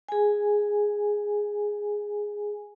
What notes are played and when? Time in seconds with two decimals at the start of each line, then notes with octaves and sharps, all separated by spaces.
0.09 G#4 G#5